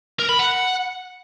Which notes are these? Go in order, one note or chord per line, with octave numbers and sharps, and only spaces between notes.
A#4
B5
F#5